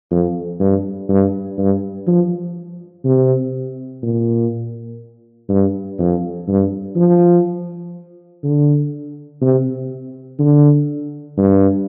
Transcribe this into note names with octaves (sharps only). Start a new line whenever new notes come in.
F2
G2
G2
G2
F3
C3
A#2
G2
F2
G2
F3
D3
C3
D3
G2